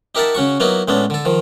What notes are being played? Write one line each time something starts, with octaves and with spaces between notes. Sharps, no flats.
D#4 G4 A#4 E5 F#5 A5
C#3 C#4 F#4 C#6
F#3 A#3 B3 D#4 E4 F#4
A2 G#3 B3 C#4 D4
D3 A4
D#3 F3